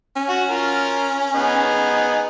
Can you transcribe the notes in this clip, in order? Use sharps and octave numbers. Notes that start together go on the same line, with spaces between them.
C#4
F#4
F4 A#4
B3 D#4 G#4